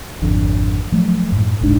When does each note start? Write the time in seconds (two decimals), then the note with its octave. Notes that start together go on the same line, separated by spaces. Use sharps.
0.22 G#1 F2 D3
0.92 F3 F#3 A3
1.32 F#2 A2
1.61 F1 C2 G#2 D4